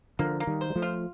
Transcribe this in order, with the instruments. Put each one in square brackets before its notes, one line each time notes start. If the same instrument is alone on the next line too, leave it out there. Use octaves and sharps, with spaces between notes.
[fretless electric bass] D3 F3 [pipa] A#3
[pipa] A#3
[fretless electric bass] D#3 G3
[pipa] C5
[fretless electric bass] G3
F3 A3
[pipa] F4